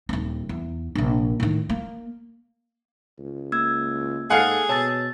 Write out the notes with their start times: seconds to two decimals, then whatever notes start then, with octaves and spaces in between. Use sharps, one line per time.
0.09 D#1 C4
0.49 E2
0.95 A#1 C3
1.40 A2 D#3
1.70 A#3
3.19 C#2
3.52 A#3 E6 G#6
4.30 G#2 G#4 A4 F5 F#5
4.69 B2 C#5 A5 E6 A6